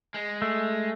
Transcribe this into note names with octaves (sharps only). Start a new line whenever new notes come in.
G#3
A3